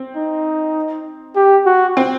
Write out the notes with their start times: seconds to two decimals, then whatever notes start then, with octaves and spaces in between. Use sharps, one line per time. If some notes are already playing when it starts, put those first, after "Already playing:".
Already playing: C4
0.16 D#4
1.36 G4
1.66 F#4
1.97 C4